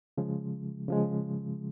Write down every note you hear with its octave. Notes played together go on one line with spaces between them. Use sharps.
C#3 F3 G#3
C#3 F3 G#3